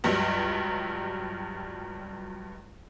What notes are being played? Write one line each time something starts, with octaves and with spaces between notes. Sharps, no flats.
C#2 G2 F#3 G3